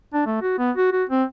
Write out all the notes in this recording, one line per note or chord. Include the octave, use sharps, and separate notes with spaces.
D4
A3
F#4
B3
F#4
F#4
C4